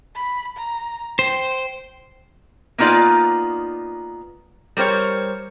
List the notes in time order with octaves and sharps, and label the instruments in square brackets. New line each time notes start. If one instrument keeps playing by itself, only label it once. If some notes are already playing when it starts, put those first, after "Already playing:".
[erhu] B5
A#5
[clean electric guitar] C5 [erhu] G5
[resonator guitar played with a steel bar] A#3 B3 D#4 F4 D5 G#5
G3 A#4 C5 C#5